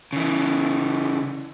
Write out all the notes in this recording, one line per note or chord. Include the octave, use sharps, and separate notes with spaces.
C#3 E3